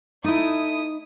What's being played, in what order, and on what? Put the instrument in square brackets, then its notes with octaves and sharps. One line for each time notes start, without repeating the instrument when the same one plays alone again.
[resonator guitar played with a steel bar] A3 E4 [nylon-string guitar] D#4 [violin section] D#6